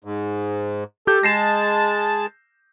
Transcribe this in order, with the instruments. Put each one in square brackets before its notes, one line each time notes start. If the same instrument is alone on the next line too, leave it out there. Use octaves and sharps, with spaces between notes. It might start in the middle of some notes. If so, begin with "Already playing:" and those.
[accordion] G#2
[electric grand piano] G4 G6 [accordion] A4
[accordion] G#3 A5 [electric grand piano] A#6 C7 E7